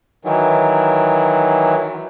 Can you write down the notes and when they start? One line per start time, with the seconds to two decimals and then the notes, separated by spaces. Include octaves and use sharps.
0.25 D#3 E3 F#3